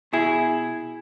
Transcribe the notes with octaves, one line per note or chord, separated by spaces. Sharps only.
B2 E4 G#4